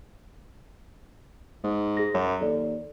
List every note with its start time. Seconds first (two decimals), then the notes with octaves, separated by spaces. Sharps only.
1.64 G#2
1.97 G#4 A#6
2.14 F#2 C#5
2.41 D#2 A4 D5